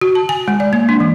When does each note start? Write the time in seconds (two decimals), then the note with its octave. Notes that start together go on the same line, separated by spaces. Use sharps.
0.01 F#4
0.15 A5
0.29 G#5
0.48 G#3
0.60 D5
0.73 A#3
0.89 D4
1.00 E3